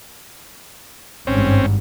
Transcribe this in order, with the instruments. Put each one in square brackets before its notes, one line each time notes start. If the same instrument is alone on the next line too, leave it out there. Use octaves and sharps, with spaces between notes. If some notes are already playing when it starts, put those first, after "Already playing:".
[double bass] G#1 G2 [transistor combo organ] C4 C#4